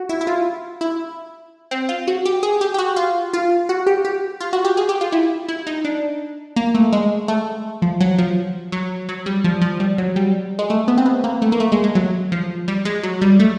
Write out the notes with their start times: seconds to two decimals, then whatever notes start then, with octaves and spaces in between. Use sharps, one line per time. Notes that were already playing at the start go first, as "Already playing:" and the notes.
Already playing: F#4
0.09 E4
0.21 E4
0.27 F4
0.81 E4
1.71 C4
1.89 F4
2.07 F#4
2.25 G4
2.43 G#4
2.61 G4
2.74 G4
2.78 F#4
2.96 F4
3.33 F4
3.69 F#4
3.87 G4
4.05 G4
4.40 F4
4.53 F#4
4.64 G4
4.77 G#4
4.89 G4
5.01 F4
5.12 E4
5.48 E4
5.67 D#4
5.85 D4
6.56 A#3
6.75 A3
6.92 G#3
7.28 A3
7.82 F3
8.00 F#3
8.18 F3
8.72 F#3
9.09 F#3
9.26 G3
9.44 F3
9.61 F3
9.80 G3
9.98 F#3
10.16 G3
10.59 G#3
10.70 A3
10.88 B3
10.97 C4
11.06 B3
11.24 A#3
11.42 A3
11.52 A#3
11.60 A3
11.72 G#3
11.84 G#3
11.95 F#3
12.32 F3
12.68 G3
12.85 G#3
13.03 F#3
13.21 G3
13.40 A3